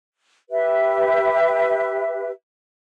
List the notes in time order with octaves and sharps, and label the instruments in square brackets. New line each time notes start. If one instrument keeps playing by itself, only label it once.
[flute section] G4 B4 E5